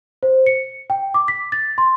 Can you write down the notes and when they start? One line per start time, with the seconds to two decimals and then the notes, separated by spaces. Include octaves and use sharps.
0.23 C5
0.47 C#7
0.90 G5
1.14 D6
1.28 B6
1.52 A6
1.78 C6